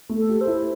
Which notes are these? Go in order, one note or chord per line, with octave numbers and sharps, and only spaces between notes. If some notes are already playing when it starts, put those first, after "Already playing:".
A3
A4
G4
C5
E4